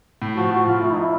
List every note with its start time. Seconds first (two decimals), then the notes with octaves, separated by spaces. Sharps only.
0.22 A2
0.37 F3 F#4
0.51 F3 F#4
0.67 A2 F4
0.81 F3 E4
0.92 A2 D#4
1.02 E4